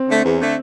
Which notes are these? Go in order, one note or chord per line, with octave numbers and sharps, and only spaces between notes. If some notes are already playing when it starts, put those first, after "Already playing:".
Already playing: C4
D3 A3
E2
D3 A3